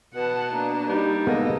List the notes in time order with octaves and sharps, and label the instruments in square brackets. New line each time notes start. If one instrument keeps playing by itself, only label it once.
[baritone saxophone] B2 [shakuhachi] B4 [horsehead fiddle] F#5 A5
[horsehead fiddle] A#3 D4 [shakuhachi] A#5
[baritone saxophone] G3 [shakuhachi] D#4
[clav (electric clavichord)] G#3 A#3 B3 [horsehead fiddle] A4 D#5